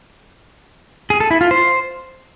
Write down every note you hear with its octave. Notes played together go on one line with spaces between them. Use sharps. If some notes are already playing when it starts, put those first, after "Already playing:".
G#4
A4
E4
F4
C5